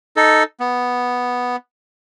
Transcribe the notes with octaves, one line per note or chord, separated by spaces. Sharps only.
D#4 A4
B3